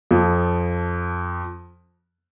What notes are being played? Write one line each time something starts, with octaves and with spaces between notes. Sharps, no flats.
F2 F3